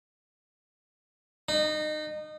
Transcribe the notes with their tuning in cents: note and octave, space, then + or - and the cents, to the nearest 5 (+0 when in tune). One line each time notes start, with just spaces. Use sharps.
D#4 -25